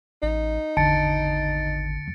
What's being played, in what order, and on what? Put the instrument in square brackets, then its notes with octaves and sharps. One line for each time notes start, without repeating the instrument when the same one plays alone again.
[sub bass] A1 [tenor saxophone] D#4
[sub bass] G#1 [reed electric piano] E2 D3 A5 [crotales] A6 C#7 D7